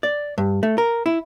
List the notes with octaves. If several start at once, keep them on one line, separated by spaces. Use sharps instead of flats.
D5
G2
A3
A#4
E4